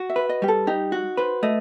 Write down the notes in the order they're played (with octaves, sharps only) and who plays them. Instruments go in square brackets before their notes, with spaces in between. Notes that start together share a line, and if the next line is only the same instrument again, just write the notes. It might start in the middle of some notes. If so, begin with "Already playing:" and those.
Already playing: [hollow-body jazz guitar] F#4
[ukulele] E5
[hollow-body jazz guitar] B4
[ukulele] D#5
[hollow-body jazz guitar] G3 [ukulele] G4
[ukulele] A4
[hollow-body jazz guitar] D#4 [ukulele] G4
[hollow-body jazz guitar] F#4
[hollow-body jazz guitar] B4 [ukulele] C5
[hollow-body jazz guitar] A3 [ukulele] D#5